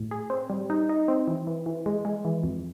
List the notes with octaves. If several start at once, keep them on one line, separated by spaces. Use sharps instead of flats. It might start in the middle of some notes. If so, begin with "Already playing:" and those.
Already playing: A2
G#4
C4
G3
D#4
D#4
C4
E3
E3
E3
G#3
G#3
E3
F2